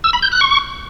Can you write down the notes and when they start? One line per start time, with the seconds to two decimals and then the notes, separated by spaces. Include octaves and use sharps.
0.04 E6
0.13 B5
0.22 G6
0.32 F#6
0.41 C#6